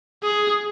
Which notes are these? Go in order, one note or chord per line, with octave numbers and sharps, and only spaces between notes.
G#4